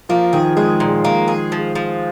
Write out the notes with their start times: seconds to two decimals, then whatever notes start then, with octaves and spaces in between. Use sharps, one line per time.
0.09 F3 A#3
0.33 D#3 G#4
0.57 G#3 G#4
0.80 A#2
1.04 A#3
1.28 G#4
1.52 F3
1.75 F3